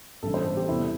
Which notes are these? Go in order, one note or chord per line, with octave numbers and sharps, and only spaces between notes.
A1 G2 E3 G3 A4
C5
A4
G4
E2 C3 G3 E4